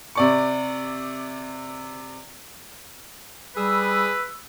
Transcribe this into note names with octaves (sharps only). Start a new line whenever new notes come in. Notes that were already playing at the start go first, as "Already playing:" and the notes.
C3 D5 C#6
G3 G#4 B4 E6